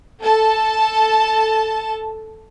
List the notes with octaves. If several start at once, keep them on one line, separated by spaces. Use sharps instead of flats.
A4 A5